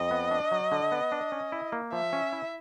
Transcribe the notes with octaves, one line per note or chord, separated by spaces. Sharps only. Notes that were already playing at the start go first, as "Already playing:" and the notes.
Already playing: F2 D#5
B3
D4
F#3
D3
B3
D4
C#4
E4
A#3
F3 E5
C#4
E4